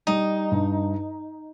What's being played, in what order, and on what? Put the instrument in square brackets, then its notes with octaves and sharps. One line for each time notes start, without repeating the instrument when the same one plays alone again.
[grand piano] G3 [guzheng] D#4
[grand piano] G2